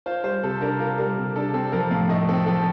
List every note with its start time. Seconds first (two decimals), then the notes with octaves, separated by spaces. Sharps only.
0.06 F4 C5
0.24 G3 C5
0.43 C3 A4
0.61 D4 A#4
0.79 F4 A#4
0.98 G3 A#4
1.17 C3
1.36 D4 A4
1.54 C4 A4
1.72 F3 A#4
1.91 A2 F5
2.09 A3 D#5
2.29 C4 A4
2.46 F3 A4